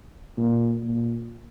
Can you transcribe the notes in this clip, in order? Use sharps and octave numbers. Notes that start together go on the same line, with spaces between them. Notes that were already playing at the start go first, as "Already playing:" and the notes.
A#2
A#2